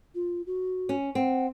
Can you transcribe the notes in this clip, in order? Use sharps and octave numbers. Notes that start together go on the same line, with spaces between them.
F4
F#4
C#4
C4 F#5